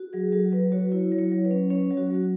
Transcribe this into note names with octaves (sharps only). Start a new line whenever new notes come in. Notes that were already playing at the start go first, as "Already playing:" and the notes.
Already playing: F#4
F#3 G#4
F#3 A4
F#3 B4
F#4 C#5
E4 C#5
F#3
C#5
F#3
B4
C#4
C#4 C#5
F#3
F#4
F#3 F#4